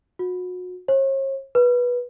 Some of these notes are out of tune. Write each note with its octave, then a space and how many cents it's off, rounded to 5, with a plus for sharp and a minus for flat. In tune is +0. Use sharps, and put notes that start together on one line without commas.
F#4 -30
C#5 -45
B4 -15